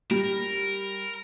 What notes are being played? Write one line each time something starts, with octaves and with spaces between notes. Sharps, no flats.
G3 A#4